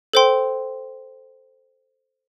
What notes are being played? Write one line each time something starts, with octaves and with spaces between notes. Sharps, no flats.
A4 C5 G5 C6